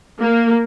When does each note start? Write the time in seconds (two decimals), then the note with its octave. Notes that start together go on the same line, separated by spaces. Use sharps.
0.21 A#3